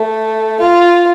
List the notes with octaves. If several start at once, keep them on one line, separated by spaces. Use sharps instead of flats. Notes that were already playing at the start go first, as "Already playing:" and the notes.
Already playing: A3
F4